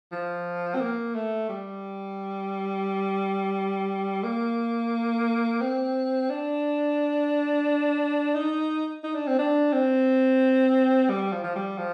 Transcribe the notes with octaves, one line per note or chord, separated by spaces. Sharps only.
F3
C4
A#3
A3
G3
A#3
C4
D4
D#4
D#4
D4
C4
D4
C4
G3
F3
F3
G3
F3